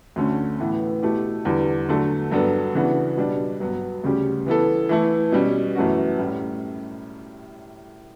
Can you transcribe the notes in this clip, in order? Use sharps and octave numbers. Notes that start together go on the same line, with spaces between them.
D2 D3 A3 C#4
A2 E3 B3
B2 A3 E4 G4
E2 D3 G3 B3
D3 F#3 A3 D4 A4
G2 F#3 B3 D4 A4
C#3 E3 B3 D4 F#4
B2 G3 D4
G2 F#3 B3
D2 C#3 G3 C#4 G4
E3 B3 E4 A4
E3 A3 E4
B2 G3 C#4
F#2 E3 A3 C#4 F#4
A2 G3 C#4